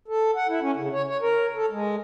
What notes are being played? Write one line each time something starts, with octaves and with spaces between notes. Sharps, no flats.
A4
F#5
E4
C#4
C#3
C#5
C#5
A#4
A4
G#3